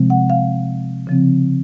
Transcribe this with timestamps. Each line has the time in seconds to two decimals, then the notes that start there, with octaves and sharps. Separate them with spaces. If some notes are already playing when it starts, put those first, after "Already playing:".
Already playing: C3 F3 G#3 C4
0.10 F#5
0.30 F5
1.07 C#3 F3 C4